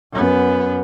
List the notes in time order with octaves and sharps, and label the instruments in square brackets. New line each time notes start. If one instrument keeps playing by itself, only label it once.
[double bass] F#2 B3